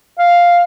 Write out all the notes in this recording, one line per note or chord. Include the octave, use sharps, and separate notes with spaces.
F5